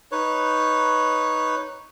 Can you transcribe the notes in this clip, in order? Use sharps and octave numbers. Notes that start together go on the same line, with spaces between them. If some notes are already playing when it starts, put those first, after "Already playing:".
D#4 B4 C#5